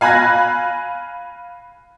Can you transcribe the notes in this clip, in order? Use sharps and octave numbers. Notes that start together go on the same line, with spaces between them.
F5 G#5 B5 F#6 G#6 A#6